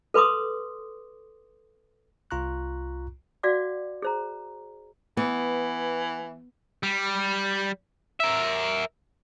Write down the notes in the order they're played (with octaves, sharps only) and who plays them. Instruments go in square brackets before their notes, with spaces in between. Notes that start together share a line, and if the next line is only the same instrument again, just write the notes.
[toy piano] A4 B4 C6 D6 D#6
[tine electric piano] C2 F4 A#5 C#6 F#6
[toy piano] F#4 D5 F5 F#5 D6
G#4 C5 A#5
[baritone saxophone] E3 [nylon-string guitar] B3
[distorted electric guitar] G3
A#4 E5